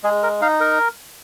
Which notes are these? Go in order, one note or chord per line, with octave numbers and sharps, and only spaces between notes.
G#3 G#4
A#4
D#4 F5
A#4